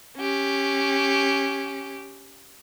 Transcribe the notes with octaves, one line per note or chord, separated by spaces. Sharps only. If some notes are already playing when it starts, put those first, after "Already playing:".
C#4 G4